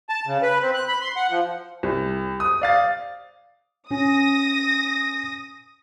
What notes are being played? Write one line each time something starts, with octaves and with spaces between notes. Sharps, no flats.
A5
C#3
B4
C4
F#6
B5
C6
F#5
F3
C2
D#6
D5 F5 A6
C#4 D#6 A#6